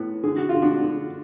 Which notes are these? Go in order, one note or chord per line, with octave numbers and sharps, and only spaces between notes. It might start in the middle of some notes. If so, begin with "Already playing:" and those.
Already playing: A2 B3
D3 G#4
F#4
F4
D3
D4 F#4
D3